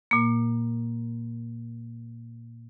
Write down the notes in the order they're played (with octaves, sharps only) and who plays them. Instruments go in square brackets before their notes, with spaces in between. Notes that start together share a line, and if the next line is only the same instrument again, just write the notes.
[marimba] A#2 A#3